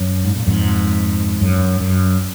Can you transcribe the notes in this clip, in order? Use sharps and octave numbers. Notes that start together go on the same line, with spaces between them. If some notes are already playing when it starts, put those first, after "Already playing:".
Already playing: F#2
G#2
A#2
F2 G#2
F#2
F#2